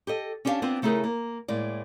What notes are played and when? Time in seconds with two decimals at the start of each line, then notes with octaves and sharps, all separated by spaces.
0.07 G4 A4 D#5
0.45 C#4 D4 G4 A#4 F5 A5
0.62 B3 C4 D4 F4
0.82 C#3 A3 D#4 E4 G#4 A#4
1.04 A#3
1.48 A2 G#3 A#3 D5